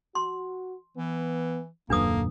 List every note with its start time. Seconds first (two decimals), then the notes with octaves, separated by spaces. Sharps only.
0.15 F#4 C6
0.97 E3 B3
1.90 D#1 F#2 A#2 A#3 D4 A4 B4 D#6